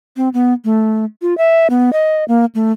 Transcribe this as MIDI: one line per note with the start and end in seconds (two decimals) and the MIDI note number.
0.17 0.29 60
0.34 0.54 59
0.65 1.05 57
1.22 1.36 65
1.38 1.67 76
1.70 1.92 59
1.93 2.24 75
2.28 2.45 58
2.55 2.72 57